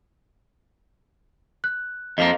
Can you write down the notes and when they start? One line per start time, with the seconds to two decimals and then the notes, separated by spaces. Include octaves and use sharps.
1.64 F#6
2.18 F2 F3 A#3 D#5